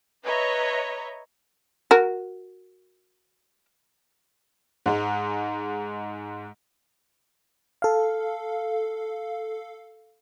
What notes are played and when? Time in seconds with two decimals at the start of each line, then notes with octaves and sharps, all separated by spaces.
0.24 B4 C#5 D#5 E5 A#5
1.91 F#4 A#4
4.86 G#2 G#3
7.82 A4 F5